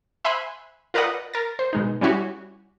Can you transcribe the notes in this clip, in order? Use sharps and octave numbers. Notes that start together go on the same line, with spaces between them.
C5 E5 G#5 B5 C6 F#6
F4 A#4 B4 D5 D#5 F#5
A#4 A6
C5
B2 G#3 D#4
G3 C#4 E4 F#4 G4